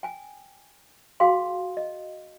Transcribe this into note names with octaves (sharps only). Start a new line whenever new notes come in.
G5 G#5
F#4 G#4 F5 G5 C6
D#5